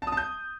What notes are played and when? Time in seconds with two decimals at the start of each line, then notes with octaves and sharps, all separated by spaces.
0.02 A5
0.07 D#6
0.12 A5
0.17 G6